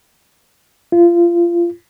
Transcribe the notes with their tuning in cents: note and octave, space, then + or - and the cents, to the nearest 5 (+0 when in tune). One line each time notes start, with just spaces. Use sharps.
F4 -25